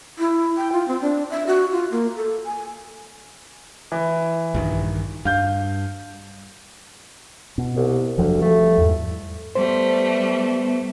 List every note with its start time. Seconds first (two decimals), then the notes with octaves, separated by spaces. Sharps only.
0.19 E4
0.57 G5
0.72 F4
0.88 C4
1.01 D4
1.30 E5
1.47 F#4
1.72 F4
1.91 A#3
2.16 A4
2.45 G#5
3.92 E3
4.55 A#1 G2 D#3
5.25 G2 F5 G6
7.58 B2
7.76 C2
8.18 F1 D2 F3 F#3
8.41 F3 G3 A3
8.78 E2 G#2
9.55 G3 A3 B3 C5